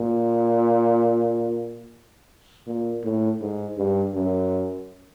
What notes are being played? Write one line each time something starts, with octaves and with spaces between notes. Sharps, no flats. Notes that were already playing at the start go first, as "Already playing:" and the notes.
Already playing: A#2
A#2
A2
G#2
G2
F#2